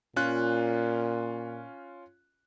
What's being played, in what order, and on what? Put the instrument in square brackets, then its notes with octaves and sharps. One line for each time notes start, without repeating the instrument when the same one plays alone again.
[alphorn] A#2 [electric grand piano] C#4 F4 F#6